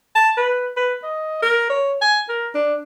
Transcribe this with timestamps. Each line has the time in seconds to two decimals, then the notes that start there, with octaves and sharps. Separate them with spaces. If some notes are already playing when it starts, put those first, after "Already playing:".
0.15 A5
0.37 B4
0.77 B4
1.03 D#5
1.42 A#4
1.70 C#5
2.01 G#5
2.29 A#4
2.55 D4